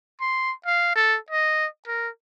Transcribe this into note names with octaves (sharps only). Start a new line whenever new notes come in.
C6
F5
A4
D#5
A#4